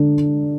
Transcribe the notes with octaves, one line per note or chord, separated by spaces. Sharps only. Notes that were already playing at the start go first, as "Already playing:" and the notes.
Already playing: D3 D4